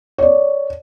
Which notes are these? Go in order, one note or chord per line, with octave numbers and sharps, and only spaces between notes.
C#5 D5